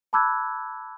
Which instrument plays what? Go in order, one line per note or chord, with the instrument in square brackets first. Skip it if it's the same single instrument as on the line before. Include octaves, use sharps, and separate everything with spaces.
[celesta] A5 B5 D6 E6 F#6 G#6